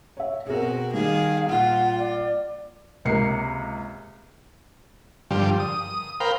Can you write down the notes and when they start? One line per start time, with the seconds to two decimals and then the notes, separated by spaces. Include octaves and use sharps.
0.17 C#5 E5
0.47 B2 C4 F#4 G#4 A#4
0.94 D#3 G3 G#4 F5
1.49 A#2 F4 F#5
1.99 D5
3.05 C#2 C3 A#3 C7 C#7
5.31 G2 D3 F3 G3
5.60 D#6
6.20 A#4 C5 F5 G5 B5